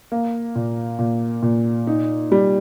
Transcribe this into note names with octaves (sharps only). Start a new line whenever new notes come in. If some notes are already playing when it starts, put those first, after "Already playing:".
A#3
A#2
A#2
A#2
D#4
G3